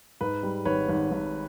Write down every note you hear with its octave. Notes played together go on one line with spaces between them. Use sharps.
G#2 B4
G3
G#1 B4 C#5
G#1
G#1